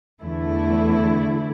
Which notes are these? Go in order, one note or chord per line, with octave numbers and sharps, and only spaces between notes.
E2 D3 A3 E4